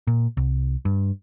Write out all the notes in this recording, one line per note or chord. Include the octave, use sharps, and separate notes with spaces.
A#2
C2
G2